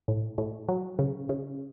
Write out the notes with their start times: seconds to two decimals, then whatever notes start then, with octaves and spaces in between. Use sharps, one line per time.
0.08 A2
0.38 A2
0.68 F#3
0.99 C#3
1.29 C#3